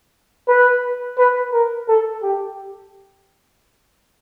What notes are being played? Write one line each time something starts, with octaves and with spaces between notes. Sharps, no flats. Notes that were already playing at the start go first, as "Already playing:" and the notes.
B4
B4
A#4
A4
G4